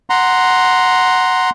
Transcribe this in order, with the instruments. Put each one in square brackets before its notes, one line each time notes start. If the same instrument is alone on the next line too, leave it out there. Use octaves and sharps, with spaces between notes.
[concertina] F#5 A#5 C6